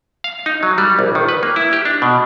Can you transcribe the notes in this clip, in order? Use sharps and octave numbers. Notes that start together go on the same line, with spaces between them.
F5
D#4
F#3
G3
A#1
D#3
B4
A#3
E4
G4
D4
B2